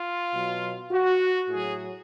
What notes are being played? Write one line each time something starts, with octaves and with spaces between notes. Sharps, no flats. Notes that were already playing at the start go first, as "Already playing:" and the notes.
Already playing: F4
B2 F#3
F#4
A2 F#3 G#4